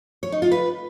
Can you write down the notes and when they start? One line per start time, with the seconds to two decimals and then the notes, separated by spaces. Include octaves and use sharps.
0.23 C#5
0.32 D#4
0.42 F4
0.52 B4